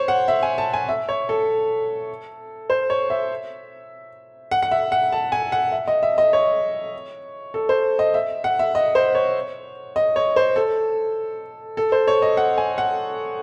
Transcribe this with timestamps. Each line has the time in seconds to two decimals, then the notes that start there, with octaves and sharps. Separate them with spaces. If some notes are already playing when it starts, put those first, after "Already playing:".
Already playing: C5 C#5
0.08 F#5
0.28 E5
0.43 G#5
0.58 A5
0.74 G#5
0.89 E5
1.09 C#5
1.29 A4
2.70 C5
2.90 C#5
3.10 E5
4.51 F#5
4.62 F#5
4.71 E5
4.92 F#5
5.12 A5
5.32 G#5
5.52 F#5
5.72 E5
5.88 D#5
6.03 E5
6.18 D#5
6.33 C#5
7.54 A4
7.69 C5
7.99 D#5
8.14 E5
8.44 F#5
8.59 E5
8.75 D#5
8.95 C5
9.15 C#5
9.96 D#5
10.16 C#5
10.36 C5
10.56 A4
11.77 A4
11.92 C5
12.08 C#5
12.22 D#5
12.37 F#5
12.58 G#5
12.78 F#5